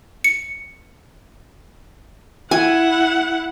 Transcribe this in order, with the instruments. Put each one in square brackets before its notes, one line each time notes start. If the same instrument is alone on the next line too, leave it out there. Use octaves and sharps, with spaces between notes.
[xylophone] C#7
[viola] E4 F#5 [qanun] G#5